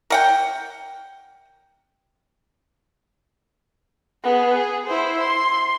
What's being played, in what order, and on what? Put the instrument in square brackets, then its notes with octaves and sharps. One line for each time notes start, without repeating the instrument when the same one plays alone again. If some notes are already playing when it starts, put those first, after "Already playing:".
[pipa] A#4 F#5 G5
[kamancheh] B3 G#4
G#4
E4 C5
C6